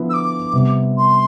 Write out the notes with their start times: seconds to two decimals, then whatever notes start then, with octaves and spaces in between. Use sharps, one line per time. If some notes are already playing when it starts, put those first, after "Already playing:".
Already playing: D3 F3 B3 E4 B4
0.09 E6
0.13 D6
0.53 C3 G3 B3
0.97 C6